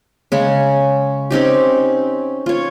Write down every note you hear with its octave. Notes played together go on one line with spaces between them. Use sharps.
C#3 G#3 C#4
C4 C#4 D#4 G4
F4 C#5